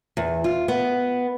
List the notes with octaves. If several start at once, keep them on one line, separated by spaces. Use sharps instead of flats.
E2
F4
B3